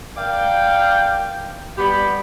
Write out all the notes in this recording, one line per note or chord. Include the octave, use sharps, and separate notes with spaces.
A#4 D5 F5 G5
G3 B3 G4 B5